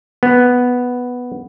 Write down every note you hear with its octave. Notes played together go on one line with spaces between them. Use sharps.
B3